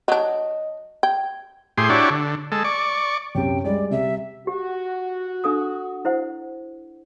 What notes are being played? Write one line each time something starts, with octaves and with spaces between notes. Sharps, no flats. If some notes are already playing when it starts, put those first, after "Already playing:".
F#3 D4 D#5
G5 G#6
A2 G4 G#4 C6
D4 E4 F#4 G4 C#5 D5
D3
G#3 A4
D5 C#6
F#2 C3 G5
G3 G#3 D5
C3 G3 E5
F#4 G4
D4 A4 D#6
E4 C5 F#5